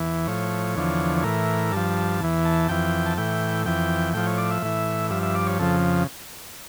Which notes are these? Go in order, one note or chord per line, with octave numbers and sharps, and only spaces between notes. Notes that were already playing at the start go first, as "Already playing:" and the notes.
Already playing: E2 E3
A2 F3 C#5
E2 D3 F3
C#5
A2 E3 A#4
G2 F3 A5
E2 E3
A5
F2 E3 G5
A5
A2 E3 G5
F2 E3 G5
A2 F3 G5
C#5
D5
E5
A2 E3
G2 F3 E5
E5
D5
C#5
F2 C#3 F3 A4